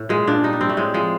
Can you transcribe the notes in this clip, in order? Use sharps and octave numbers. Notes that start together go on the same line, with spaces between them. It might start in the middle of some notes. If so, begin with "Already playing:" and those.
Already playing: A2
A#2 G#3
A#2 D4
G3 D#4
D4
G3 C4
A3
A2 G#3
F3 G#3